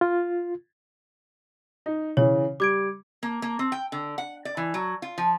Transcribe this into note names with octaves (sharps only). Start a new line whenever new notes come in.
F4
D#4
C#3 E3 C#5
G3 D6 G#6 D7
A#3
A#3
C4
G5
D3
F#5
D5
E3
F#3
F4
F3